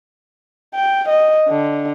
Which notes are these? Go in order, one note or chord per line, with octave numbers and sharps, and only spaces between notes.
G5
D#5
D3